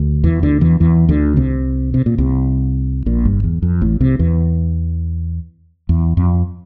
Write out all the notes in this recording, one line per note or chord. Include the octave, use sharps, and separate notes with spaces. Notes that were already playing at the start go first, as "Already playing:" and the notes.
Already playing: D2
E2 E3
D2 D3
E2 E3
E2 E3
D2 D3
C2 C3
C3
A#2
C2 C3
A#1 A#2
G1 G2
E2
F2
A1 A2
C2 C3
E2 E3
E2
F2